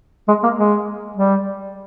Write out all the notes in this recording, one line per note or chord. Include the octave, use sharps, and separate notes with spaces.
G#3
A#3
G#3
G3